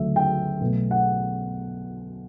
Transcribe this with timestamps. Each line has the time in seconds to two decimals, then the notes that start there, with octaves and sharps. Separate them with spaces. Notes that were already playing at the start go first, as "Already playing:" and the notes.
Already playing: D2 C#3 F#3 A3 E5
0.16 G5
0.60 B1 B2 F#3 A3
0.91 F#5